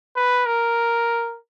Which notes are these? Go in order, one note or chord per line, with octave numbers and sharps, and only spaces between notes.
B4
A#4